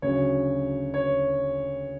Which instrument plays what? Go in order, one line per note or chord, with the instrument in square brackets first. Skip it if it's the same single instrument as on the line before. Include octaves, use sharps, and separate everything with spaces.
[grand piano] D2 C#3 F#3 C#5
C#5